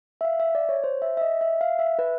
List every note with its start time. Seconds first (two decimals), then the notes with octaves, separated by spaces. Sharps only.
0.21 E5
0.25 F5
0.40 E5
0.55 D5
0.69 C#5
0.84 C5
1.02 E5
1.17 E5
1.21 D#5
1.41 E5
1.61 F5
1.79 E5
1.99 B4